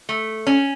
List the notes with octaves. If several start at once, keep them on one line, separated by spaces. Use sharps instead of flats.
A3
C#4